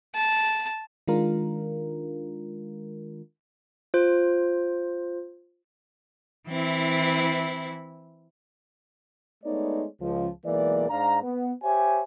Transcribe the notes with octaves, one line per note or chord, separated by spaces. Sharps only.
A5
D#3 G#3 D4 F4 A#4
F4 C5
E3 C4 E4
G#3 A3 B3 D#4 C#5 D5
C#2 F3
B1 E3 G#3 A#3 D5
G#2 D4 F5 A#5
B3
G4 C5 C#5 E5 G#5